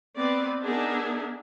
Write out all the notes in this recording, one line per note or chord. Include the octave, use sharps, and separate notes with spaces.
B3 C4 B4 D5
B3 D4 D#4 G#4 A#4 E5